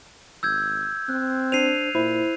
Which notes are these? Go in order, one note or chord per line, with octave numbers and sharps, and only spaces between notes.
G#1 E6 G6 G#6
C4 F#6
D4 C5 C7 D#7 F7
A#2 E4 C5